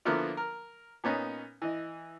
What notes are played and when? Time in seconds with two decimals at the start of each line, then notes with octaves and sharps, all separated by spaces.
0.05 D3 F3 A#3 B3 E4 F4
0.37 A#4
1.04 A#2 B3 C#4 D#4
1.62 E3 D#5